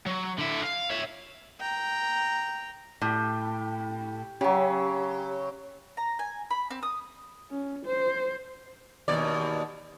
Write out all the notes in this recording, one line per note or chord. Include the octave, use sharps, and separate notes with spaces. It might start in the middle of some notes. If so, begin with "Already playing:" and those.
F#3
D3 E4
F5
C#5 E5
G5 A#5
A2 G4
C#3 F#3 G4
A#5
G#5
B5
C4
D#6
C#4
C5
D#2 B2 D5